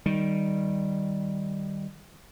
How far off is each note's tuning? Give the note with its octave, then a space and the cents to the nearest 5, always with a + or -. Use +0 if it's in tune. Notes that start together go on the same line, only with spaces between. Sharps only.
D#3 +0 G3 +0